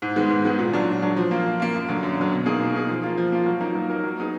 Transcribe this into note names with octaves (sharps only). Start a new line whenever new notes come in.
G#2
D#3 G#3 B3
G#2
D#3 G#3 B3
A#2
F#3 D4
A#2
F#3 D4
F3
A#3 F4
F3
A#3 F4
F#2
D3 F#3
F#2
D3 F#3
B2
A#3 D#4 G#4
B2
A#3 D#4 G#4
F3
A#3 F4
F3
A#3 F4
F#3
A#3 D#4 A#4
F#3
A#3 D#4 A#4
F#3
B3 D#4 G#4